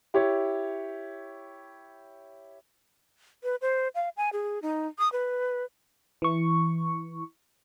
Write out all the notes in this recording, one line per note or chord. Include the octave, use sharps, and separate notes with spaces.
E4 G4 C#5
B4
C5
F5
G#5
G#4
D#4
D#6
B4
E3 C#6